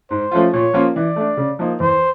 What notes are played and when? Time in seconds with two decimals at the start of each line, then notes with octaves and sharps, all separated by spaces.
0.10 G#2 C5
0.31 F3 A3 C#4 F4
0.53 A#2 C#5
0.73 F3 A#3 C#4 F4
0.95 E3 D5
1.16 A3 D4
1.37 C#3
1.59 F3 A#3 D#4
1.80 E2 C5